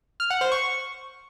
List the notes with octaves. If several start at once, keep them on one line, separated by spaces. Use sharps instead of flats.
F6
F#5
C5
C#6